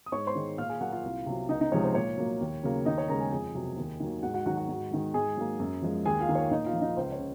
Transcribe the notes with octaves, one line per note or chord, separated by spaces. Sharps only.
D#6
G#2 C#5 C#6
C5 C6
D#3 G#3
A#2 F5 F6
G#4 G#5
F#3 A#3 F#4 F#5
F4 F5
C2
C3 F#3
C#2 D#4 D#5
D#4 D#5
C3 F3 G#3 C#5
C5
A#2 C#5
F#3 A#3
D#2
C#3 F#3 A#3
D#2 D#4 D#5
C#5
C#3 G#3 A#4 A#5
G#4 G#5
F2 G#4 G#5
C3 F#3
D#2
D#3 F#3 A#3
G#2 F#4 F#5
F#4 F#5
D#3 F#3 F#4 F#5
F#4 F#5
G#2
D#3 G#3
G#2 G#4 G#5
F#3 A#3
F#2
F3 G#3
D#2 G#4 G#5
F4 F5
D#3 A#3
C#5
A#2 D#4 D#5
F4 F5
F3 A#3
D#4 D#5
C#2 C5
C#5
C#3